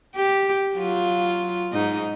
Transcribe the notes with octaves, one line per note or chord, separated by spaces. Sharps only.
G4
F#3 F4
G#2 D#4